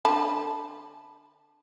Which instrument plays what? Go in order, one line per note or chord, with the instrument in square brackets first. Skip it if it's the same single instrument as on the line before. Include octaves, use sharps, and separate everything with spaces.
[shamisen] D3 A5 B5